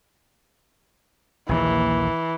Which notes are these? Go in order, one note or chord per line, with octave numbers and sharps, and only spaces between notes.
A#1 D#2 E3 A#3